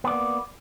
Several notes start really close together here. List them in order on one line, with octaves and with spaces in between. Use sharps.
B3 D5 A#3